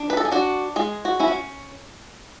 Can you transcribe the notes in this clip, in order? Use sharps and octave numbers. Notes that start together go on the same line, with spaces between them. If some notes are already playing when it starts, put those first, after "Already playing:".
Already playing: D4
B4
A4
G#4
D4 F#4
G#3 G#4
F#4
C#4 E4
F#4